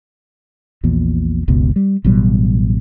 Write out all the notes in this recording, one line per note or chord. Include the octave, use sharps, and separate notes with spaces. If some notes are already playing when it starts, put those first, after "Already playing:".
A#1 E2 A#2
F#1 C#2 B2
G3
A1 B2 F#3 G3